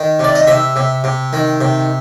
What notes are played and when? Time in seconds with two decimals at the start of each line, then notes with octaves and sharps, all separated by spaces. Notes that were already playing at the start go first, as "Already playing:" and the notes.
Already playing: D#3
0.19 C3 D5
0.35 D#5
0.47 C3 E5
0.76 C3
1.04 C3
1.33 D#3
1.61 C3